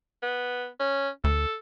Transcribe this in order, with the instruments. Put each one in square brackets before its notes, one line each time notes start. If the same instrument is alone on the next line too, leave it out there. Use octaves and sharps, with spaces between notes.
[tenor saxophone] B3
C#4
[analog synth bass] D2 [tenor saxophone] A4